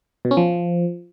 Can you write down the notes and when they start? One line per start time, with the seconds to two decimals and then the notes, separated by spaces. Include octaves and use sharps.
0.25 B2
0.31 C#4
0.37 F3